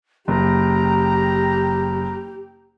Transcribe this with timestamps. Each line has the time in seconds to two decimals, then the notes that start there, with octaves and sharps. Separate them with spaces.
0.28 F#1 G4 A#5